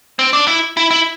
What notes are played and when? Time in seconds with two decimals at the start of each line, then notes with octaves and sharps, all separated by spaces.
0.19 C4
0.33 D4
0.48 E4
0.77 E4
0.91 E4